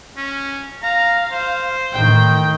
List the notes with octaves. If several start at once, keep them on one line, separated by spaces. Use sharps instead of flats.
C#4
F5 A#5
C5
A2 D#3 G5